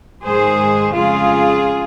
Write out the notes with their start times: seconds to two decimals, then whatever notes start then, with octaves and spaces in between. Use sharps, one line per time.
0.23 G#2 D#3 G#3 G#4 C5
0.94 F2 C#3 G#3 F4 G#4